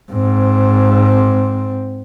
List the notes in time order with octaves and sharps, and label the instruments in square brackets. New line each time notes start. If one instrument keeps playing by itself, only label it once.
[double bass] G#2 C4